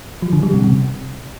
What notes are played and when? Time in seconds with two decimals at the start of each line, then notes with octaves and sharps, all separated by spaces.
0.22 F3
0.33 D3
0.43 G3
0.54 C3
0.64 C3